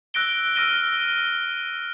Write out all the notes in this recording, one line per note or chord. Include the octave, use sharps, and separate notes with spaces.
E6 F#6 A#6 D7 G7
E6 F6 A#6 D#7 G7